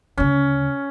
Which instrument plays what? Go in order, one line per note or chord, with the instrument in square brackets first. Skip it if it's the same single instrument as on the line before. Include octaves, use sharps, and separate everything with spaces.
[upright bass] D2 C#3 [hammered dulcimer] C#4